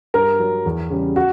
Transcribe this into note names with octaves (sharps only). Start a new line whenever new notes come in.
G2 A#4
F#3
E2
C#3 G3
F#4